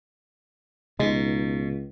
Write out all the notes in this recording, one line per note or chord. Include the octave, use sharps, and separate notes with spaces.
C#2 B2 G#3 D#4